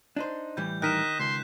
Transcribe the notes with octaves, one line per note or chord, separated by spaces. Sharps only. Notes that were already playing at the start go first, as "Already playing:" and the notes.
D4 D#4 C5
A2 E3 G3 G6
D#3 D#4 A#4 D#5 F#6 B6 E7
C#2 C6